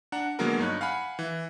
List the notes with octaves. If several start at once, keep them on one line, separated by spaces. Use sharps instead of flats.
D4 F#5 A#5
D3 F#3 G#3 A#3 B3 A#4
G2 D#4 C#5 F#6
F5 F#5 G#5 B5
E3